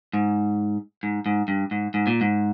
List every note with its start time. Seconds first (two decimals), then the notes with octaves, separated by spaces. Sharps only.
0.13 G#2
1.03 G#2
1.26 G#2
1.48 G2
1.71 G#2
1.94 G#2
2.07 A#2
2.21 G#2